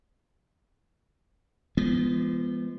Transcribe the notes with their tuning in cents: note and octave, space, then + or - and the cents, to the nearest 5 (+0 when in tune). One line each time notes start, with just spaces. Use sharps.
F3 -30 G#3 +0 B3 +0